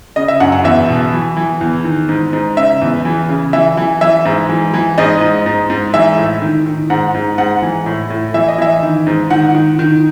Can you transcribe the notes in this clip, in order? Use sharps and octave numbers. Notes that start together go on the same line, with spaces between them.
C#3 D#5
E5
F#2 F#5
F#5
E2 E5
B2
E3
E3
E2
D#3
G#2
G#2
C#3 E5
E2
E3
C#3
E3 E5
E3
E3 E5
G#2
E3
E3
G#2 D#5
G#2
G#2
G#2
E3 E5
A2
D#3
D#3
G#2 F#5
G#2
G#2 F#5
E3
A2
A2
E3 E5
D#5
E3 E5
D#3
G#2
D#3 F#5
D#3
D#3